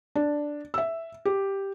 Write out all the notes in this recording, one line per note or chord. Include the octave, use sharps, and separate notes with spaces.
D4
E5 E6
G4